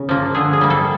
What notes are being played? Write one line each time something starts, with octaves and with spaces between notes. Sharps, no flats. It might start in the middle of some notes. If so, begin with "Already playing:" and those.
Already playing: C#3
F3 A#3
D3 G#4
G#4
G3 A#3
A4